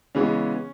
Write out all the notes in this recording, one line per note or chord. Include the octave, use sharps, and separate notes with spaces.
C#3 E3 G#3 B3 C#4